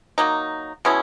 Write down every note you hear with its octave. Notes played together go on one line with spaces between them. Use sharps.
F#3 A#3 D#4
B2 G#3 C#4 E4